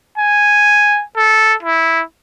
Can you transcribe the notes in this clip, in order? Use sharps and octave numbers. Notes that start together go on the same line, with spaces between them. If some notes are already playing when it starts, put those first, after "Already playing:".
G#5
A4
E4